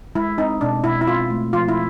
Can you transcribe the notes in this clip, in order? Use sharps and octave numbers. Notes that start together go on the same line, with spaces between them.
G#3 E4
C4 D#4
B2 D4
B2 E4
E4
C4 F4
A3
F3 F4
E4